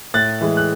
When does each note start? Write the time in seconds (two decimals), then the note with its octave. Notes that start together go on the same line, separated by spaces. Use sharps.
0.14 A2 F#6 A6
0.41 E3 G#3
0.57 F#6